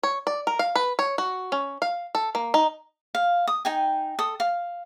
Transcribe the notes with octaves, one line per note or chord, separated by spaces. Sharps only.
C#5
D5
A#4
F5
B4
C#5
F#4
C#4
F5
A4
A#3
D#4
F5
D#6
D#4 G5 G#5
A4 D#6
F5